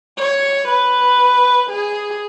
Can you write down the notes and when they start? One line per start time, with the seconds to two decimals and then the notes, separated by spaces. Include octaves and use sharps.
0.18 C#5
0.68 B4
1.70 G#4